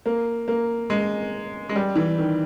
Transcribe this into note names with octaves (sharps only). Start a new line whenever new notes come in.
A#3
A#3
G#3
G#3
G3
E3
D#3